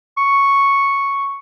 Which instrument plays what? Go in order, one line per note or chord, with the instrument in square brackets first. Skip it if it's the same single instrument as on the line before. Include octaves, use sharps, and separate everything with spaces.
[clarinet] C#6